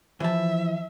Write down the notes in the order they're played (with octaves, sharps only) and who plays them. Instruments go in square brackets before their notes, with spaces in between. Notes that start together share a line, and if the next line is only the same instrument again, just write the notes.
[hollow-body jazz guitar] E3 A5 [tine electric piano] F3 [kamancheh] E5